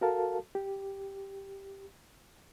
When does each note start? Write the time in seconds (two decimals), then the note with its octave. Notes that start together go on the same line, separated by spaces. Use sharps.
0.01 F#4 A4 A#4 F5 A5
0.55 G4